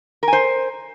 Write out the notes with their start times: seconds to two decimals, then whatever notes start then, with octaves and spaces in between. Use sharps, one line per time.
0.23 A#4
0.28 G#5
0.33 C5